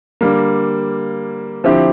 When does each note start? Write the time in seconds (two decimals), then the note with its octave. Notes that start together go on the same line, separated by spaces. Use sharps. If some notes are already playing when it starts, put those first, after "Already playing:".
0.21 D3 G3 A#3
1.64 D3 F3 C4 E4 G4